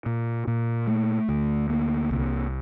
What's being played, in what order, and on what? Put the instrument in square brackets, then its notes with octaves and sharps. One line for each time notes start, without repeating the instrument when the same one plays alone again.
[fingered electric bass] A#2
A#2
A3
D2
A#3
C2